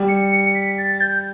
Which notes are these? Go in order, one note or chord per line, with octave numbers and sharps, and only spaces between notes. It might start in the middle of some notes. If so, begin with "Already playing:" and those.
Already playing: G3
C#7
C#7
B6
A6
A6
G6